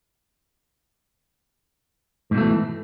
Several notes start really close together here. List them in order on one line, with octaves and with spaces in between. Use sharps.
G#2 B2 A3 E3